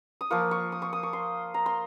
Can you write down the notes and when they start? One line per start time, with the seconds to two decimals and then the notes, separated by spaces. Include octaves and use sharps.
0.21 D#6
0.30 F3 A#3 F4 C#6
0.51 C#6
0.72 D#6
0.82 C#6
0.93 D#6
1.03 C#6
1.13 C6
1.54 A#5
1.66 C6